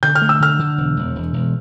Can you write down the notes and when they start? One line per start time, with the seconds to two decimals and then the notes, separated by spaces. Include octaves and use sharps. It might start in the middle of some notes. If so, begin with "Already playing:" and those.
0.03 D3 G6
0.15 F6
0.22 A3
0.29 E6
0.40 D3 F6
0.59 D3
0.78 E1
0.97 E1
1.16 E1
1.33 E1